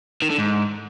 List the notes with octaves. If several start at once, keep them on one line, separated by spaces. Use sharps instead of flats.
D#3
D3
G#2